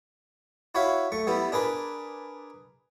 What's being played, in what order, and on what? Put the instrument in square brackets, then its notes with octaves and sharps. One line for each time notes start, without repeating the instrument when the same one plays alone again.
[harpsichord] E4 F#4 C#5 E5 F5
A3 C#6
G3 B3 E4
D4 G#4 A#4 B4